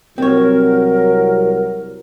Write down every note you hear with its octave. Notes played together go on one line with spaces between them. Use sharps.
C2 F#3 C4 A#4 C#5